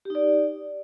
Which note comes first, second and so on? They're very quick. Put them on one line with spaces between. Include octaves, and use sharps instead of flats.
G4 D#4 D5